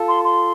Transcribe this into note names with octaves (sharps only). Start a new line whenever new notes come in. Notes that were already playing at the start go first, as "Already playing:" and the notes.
Already playing: F4 A4
C6
C6